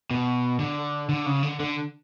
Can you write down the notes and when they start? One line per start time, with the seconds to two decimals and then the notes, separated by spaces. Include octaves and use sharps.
0.11 B2
0.60 D3
1.09 D3
1.26 C#3
1.43 D3
1.60 D3